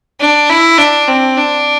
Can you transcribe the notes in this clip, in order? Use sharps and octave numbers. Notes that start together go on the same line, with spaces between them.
D4
E4
D4
C4
D4